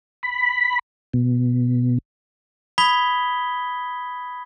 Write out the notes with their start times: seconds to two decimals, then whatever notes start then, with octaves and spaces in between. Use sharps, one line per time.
0.23 B5
1.14 B2
2.78 B5 D#6 G#6 B6 G7